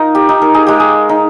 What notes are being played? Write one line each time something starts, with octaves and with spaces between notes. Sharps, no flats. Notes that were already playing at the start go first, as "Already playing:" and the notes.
Already playing: D#4 F4 A#4
G4
D#4
A#4
G#4
G#3 G4
G#4
D#4